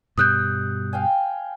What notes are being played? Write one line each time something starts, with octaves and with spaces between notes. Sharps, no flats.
G2 B2 G3 D#6 F#6 G6
F5 G5 G#5